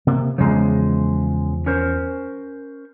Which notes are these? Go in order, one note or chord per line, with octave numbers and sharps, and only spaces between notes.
C3 A#3
E2 C#3 F3 G#3
C#4 A#4 C5